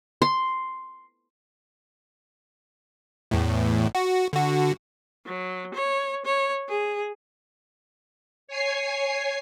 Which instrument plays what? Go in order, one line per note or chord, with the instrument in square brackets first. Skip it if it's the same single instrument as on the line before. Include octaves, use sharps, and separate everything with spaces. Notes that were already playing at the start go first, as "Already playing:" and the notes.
[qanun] C6
[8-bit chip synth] E2 A2
F#4
D3 F#4
[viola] F#3
C#5
C#5
G#4
[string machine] C#5 G#5 C7